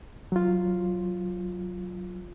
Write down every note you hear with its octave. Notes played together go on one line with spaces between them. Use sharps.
F#3 F4